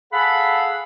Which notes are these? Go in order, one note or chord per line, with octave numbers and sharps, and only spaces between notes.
G#4 A4 F5 F#5 B5